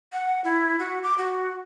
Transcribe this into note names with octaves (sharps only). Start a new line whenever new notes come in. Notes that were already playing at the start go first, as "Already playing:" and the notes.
F#5
E4
F#4
D6
F#4